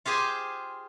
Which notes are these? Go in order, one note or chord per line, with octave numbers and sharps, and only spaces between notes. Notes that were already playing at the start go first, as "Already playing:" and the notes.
F4 G4 G#4 C5 G#5